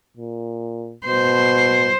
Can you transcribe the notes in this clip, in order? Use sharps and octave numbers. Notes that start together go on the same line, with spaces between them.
A#2
B2 C5